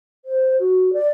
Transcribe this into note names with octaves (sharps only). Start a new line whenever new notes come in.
C5
F#4
D5